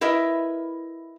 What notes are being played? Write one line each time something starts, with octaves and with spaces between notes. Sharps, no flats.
E4 A#4 B4 D#5 E5